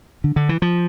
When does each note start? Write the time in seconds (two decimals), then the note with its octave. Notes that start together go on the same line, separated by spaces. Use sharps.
0.24 D3
0.36 D3
0.49 E3
0.62 F3